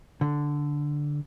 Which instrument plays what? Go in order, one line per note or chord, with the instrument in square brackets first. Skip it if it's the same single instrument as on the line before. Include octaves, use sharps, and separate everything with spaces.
[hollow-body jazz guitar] D3